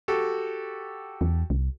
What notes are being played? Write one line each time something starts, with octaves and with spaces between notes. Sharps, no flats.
F#4 G4 A4
E2
C2